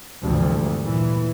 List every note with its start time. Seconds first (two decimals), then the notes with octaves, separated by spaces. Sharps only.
0.23 G#1 D2 G2 C3 E3 F3
0.80 A#2 E3